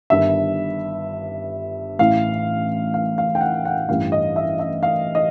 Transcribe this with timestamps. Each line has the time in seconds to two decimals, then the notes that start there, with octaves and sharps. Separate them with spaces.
0.10 G1 G2 D#3 E5
1.99 A1 A2 E3 F5
2.94 F5
3.18 F5
3.35 G5
3.41 F#5
3.65 F#5
3.89 A1 G2 E3 F5
4.12 D#5
4.36 E5
4.59 E5
4.83 F5
5.15 D#5